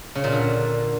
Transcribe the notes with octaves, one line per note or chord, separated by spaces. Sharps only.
C#3
A#2
D3